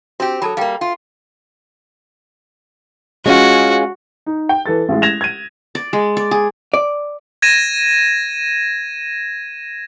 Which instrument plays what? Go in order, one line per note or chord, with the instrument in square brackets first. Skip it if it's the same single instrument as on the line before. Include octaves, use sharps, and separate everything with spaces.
[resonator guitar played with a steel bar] C4 G4 [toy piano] F#4
[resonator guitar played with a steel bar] F#3 [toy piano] A4 A5 B5
[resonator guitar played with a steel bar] G3 A#3 [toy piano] F5 G5
[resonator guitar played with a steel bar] F4
[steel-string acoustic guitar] G#3 C#4 F4 [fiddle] F#4
[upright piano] D#4
G5
E3 A4 A6
A1 G#3
G#6 A#6 E7 F7
G#6 D#7
[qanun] D5
G#3
D5
G#4
[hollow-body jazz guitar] D5
[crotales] G#6 A#6 D#7 E7